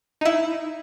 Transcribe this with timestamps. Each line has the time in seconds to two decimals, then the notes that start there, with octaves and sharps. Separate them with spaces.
0.21 D#4 E4